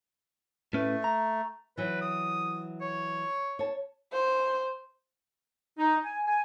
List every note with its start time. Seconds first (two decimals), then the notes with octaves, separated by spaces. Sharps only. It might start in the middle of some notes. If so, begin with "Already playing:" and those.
0.73 A2 A3 C#4 B4
1.04 A#5
1.77 E3 F#3 B4
2.02 D#6
2.81 C#5
3.59 C#5 A5
4.13 C5
5.78 D#4
6.04 G#5
6.26 G#5